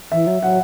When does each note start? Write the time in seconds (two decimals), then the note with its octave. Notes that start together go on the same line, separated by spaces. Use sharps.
0.12 E3 E5
0.27 F#3
0.42 F#3 F#5